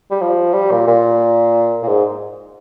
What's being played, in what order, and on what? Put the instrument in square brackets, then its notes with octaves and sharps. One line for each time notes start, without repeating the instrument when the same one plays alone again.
[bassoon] G3
F3
G3
A#2
A#2
A#2
G#2